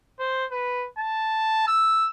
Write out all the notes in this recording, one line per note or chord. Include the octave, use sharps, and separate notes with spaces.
C5
B4
A5
E6